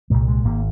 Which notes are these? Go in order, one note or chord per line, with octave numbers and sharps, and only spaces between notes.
C2 A#2 G#3
G#3
G#1 A#3